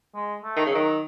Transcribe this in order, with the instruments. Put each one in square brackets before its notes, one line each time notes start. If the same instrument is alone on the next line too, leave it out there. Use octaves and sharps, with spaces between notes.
[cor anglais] G#3
A3
[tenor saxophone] D#3
C#3
[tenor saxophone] D#3 [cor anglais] F#3